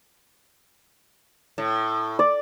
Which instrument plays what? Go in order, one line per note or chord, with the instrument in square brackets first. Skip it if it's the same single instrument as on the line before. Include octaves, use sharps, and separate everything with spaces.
[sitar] A2
[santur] D5